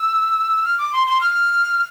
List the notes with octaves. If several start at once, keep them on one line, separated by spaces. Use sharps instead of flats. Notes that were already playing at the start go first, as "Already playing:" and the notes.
Already playing: E6
F6
D6
C6
C6
F6